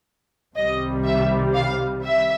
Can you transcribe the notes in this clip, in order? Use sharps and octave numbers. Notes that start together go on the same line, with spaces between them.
C2 C3 D#3 G3 D#5
E5
F5
E5